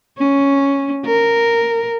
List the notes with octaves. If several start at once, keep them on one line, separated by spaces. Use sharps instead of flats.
C#4
A#4